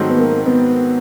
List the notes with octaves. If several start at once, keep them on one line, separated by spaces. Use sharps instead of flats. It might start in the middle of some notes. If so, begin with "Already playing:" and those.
Already playing: G#2 D#3 F#3 A3 C4
B3
A#3
B3